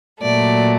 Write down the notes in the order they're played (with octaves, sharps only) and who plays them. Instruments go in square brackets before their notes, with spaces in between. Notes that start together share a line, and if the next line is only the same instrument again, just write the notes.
[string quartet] A#2 F#3 A3 D5